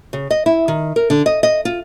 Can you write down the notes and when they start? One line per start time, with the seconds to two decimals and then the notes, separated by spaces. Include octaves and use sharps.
0.13 C#3
0.31 D#5
0.46 E4
0.68 D#3
0.96 A#4
1.10 D3
1.26 D#5
1.43 D#5
1.65 F4